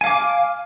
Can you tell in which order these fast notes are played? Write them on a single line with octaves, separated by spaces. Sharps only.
G#5 F5 D6